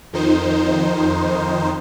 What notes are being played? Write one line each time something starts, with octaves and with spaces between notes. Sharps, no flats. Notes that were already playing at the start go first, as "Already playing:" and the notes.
F2 D#3 D#4 C5